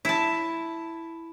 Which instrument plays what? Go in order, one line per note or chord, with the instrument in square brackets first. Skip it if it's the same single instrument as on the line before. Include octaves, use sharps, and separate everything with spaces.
[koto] E4 A5